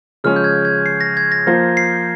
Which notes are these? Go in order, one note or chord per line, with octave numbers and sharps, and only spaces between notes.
C#3 F3 G#3 C#4 F6
G6
G#6
G#6
C7
A#6
G#6
A#6
F3 A#3 F4 C5 A#6
C7